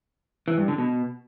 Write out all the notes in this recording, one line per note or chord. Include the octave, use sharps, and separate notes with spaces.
E3
G2
D3
B2